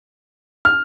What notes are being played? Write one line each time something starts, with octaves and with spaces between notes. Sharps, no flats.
F6